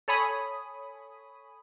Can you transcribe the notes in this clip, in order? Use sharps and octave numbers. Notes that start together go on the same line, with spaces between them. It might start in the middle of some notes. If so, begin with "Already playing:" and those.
A4 C#5 G#5 B5 D#6